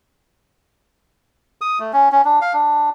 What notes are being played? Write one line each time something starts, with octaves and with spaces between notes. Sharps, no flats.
D#6
A3
C#4
C#4
D4
F5
D4